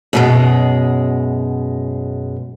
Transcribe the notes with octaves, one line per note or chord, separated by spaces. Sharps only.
F#2 B2 G#3